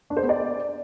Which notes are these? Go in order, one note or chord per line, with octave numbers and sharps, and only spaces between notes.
D4
C5
B3
D5